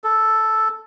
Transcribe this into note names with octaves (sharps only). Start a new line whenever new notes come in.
A4